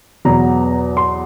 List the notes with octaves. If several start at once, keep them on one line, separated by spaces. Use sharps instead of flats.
E2 B2 F#3 B3 A#5
C6